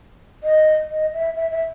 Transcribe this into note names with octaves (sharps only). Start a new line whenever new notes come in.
D#5
D#5
E5
E5
E5